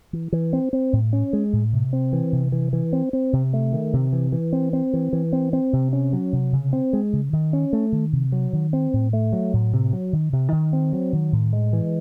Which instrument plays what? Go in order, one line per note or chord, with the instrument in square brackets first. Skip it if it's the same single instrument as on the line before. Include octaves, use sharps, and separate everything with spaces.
[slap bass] E3
E3
C4
C4
A2
C#4
G#3
A2
C3
C4
E3
C3
E3
E3
C4
C4
C3
A3
D#3
C3
E3
E3
C4
C4
E3
E3
C4
C4
C3
C#4
F#3
C3
C#3
C4
G#3
C#3
D#3
C#4
A3
D#3
C3
F#3
D#3
C4
A2
A3
F#3
A2
C3
F#3
D#3
C3
D#3
C4
F#3
D#3
A2
G#3
E3